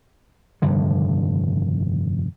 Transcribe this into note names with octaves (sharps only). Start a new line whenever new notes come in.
F1 G2 D3 D#3